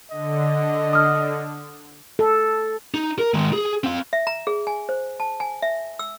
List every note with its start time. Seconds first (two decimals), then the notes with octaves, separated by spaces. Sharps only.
0.11 D3 D#5
0.93 D#6 F6
2.19 A4
2.94 D#4
3.19 A#4
3.34 D#3 G#3
3.53 G#4
3.84 C4 F5
4.13 E5
4.27 A#5
4.47 G#4
4.67 G#5
4.89 C5
5.20 A5
5.40 G#5
5.62 E5
5.99 E6